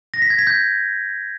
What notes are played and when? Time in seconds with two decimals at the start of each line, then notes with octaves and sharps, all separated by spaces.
0.14 A#6
0.22 B6
0.30 G#6
0.39 B6
0.47 G6